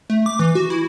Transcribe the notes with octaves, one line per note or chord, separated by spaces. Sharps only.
A3
D6
E3
F#4
E4